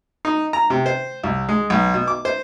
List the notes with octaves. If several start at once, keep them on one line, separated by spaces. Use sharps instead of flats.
D#4
A#5
C3
C5
C2
G#3
B1
B2
D6
C5